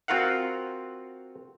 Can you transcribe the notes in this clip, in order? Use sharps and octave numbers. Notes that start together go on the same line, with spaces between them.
C4 F4 F#4 A#4 F5 F#5